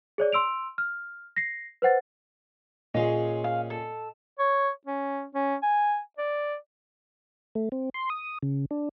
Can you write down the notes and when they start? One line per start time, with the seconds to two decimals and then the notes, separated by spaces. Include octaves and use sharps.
0.18 G#4 C#5 D5
0.33 C6 E6 D7 F7
0.78 F6
1.36 A#6 C7
1.82 B4 C5 F#5 A6
2.94 A#2 C#4 F4 G#4 D#5
3.44 F5
3.70 A4
4.39 C#5
4.87 C#4
5.35 C#4
5.62 G#5
6.18 D5
7.55 A3
7.72 C4
7.94 C6
8.10 D#6
8.43 C#3
8.71 D4